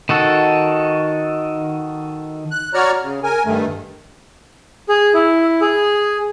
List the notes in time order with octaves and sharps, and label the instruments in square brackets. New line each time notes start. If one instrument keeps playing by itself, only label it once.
[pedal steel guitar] D#3 F#4 A4
[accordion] F#6
F#4 C#5 D5 A#5 F6
C#3
A#4 G#5
G2 D#3 A3
[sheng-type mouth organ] G#4
E4
G#4